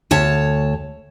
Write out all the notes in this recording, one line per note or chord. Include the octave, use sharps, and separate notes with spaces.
D2 C#5 A5